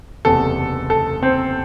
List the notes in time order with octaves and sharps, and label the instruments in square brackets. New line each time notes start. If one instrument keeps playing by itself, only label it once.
[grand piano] F#1 E2 C3 A4
A4
C4 C5